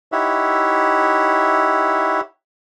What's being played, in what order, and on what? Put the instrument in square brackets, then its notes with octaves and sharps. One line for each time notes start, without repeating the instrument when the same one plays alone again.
[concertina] D#4 E4 G4 C#5 E5 F#5